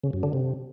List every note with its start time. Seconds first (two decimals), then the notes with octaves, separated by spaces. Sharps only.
0.04 C#3
0.13 F#2
0.23 D3
0.33 C3